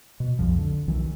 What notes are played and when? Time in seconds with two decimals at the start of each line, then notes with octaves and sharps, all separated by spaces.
0.20 B2
0.39 B1 F2 F3
0.58 D3
0.87 B1 D#3 E3 F#3